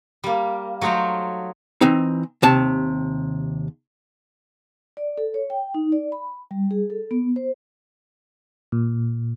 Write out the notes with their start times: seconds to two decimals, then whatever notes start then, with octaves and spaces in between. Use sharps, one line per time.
0.24 G3 A#3
0.81 F#3 A3 D#4 C5 F5
1.81 E3 C4 D#4
2.42 D#2 C3 A5
4.97 D5
5.18 A4
5.34 C#5
5.50 G5
5.74 D#4
5.92 D5
6.12 B5
6.51 G3
6.71 G#4
6.90 A4
7.11 B3
7.36 C5
8.72 A#2